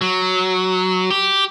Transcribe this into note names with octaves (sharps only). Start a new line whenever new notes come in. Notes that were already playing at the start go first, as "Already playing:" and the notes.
F#3
G4